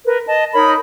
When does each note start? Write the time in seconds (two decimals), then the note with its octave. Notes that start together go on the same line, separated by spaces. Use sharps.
0.06 A#4 B4
0.27 D#5 A5
0.54 D#4 A#4 C#5 B5